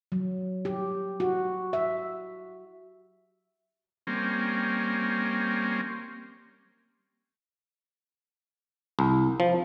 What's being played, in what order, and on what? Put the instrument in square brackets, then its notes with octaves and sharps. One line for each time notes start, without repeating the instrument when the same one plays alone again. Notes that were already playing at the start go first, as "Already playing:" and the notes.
[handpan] F#3
G4
F#4
E5
[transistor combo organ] G3 A#3 C4 C#4
[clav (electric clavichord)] C2
F3